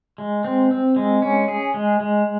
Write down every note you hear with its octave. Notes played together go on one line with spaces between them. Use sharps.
G#3
C4
C4
G#3
C#4
G#4
G#3
G#3